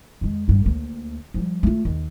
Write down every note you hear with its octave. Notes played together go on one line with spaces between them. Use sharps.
F2 G#3
A1 G2
D2 A#3
F3 G3
A3 F4
D#2